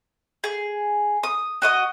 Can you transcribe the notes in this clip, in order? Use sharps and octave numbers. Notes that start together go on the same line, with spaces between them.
G#4
D#6
F#4 D#5 D#6